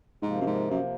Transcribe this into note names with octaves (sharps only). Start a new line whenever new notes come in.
G#2 C3 F3 A#3
F#2
G#2
F#2